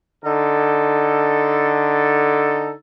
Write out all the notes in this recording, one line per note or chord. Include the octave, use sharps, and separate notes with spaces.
D3 D#4 A4